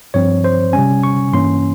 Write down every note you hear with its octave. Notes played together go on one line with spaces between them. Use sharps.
G2 F3 C4 C#5
C5
C3 G3 C#4 G#5
C#6
G2 E3 A#3 C#4 C6